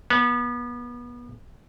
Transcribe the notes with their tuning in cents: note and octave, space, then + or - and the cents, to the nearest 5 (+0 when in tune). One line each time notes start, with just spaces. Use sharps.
B3 -30